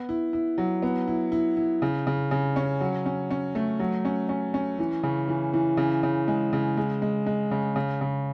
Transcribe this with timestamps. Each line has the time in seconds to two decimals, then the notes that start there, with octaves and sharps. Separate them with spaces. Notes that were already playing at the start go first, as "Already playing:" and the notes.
Already playing: B3
0.09 E4
0.33 E4
0.58 F#3
0.82 B3
1.07 E4
1.32 E4
1.57 E4
1.82 C#3
2.07 C#3
2.31 C#3
2.56 C#4
2.81 F#3
3.06 C#4
3.31 C#4
3.55 A3
3.79 F#3
4.05 C#4
4.29 C#4
4.54 C#4
4.79 E3
5.03 C#3
5.28 E3
5.53 E3
5.77 C#3
6.03 C#3
6.28 G#3
6.53 C#3
6.77 G#3
7.02 G#3
7.26 G#3
7.51 C#3
7.76 C#3
8.01 C#3